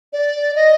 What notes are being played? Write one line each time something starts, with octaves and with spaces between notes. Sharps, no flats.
D5
D#5